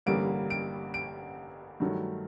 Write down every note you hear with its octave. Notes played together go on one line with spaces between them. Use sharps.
A1 G2 D3 G3 A#3 D7
D7
D7
G2 D#3 F#3 A3